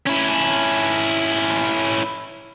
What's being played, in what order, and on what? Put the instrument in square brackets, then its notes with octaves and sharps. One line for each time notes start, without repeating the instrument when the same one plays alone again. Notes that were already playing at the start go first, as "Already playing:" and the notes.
[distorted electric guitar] C#4 E4